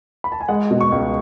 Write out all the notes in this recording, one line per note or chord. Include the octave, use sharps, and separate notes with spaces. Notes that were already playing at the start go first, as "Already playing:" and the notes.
B5
A5
G#5
G#3 F#5
B2
C#6
C#2